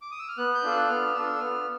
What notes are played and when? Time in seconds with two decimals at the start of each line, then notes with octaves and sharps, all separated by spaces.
0.02 D6
0.11 D#6
0.19 E6
0.28 F6
0.38 B3 F#6
0.55 G6
0.63 D4 F4 A4
0.72 F#6
0.89 B3 F6
1.14 D4 F4 A4 E6
1.40 B3 F6